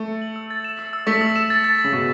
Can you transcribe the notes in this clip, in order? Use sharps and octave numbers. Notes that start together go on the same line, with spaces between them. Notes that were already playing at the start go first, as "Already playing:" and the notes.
Already playing: A3
C#7
F#7
E6
A6
E7
E6
E6
A3 B6
E6
E7
A6
A6
A6
C#3
B2 A6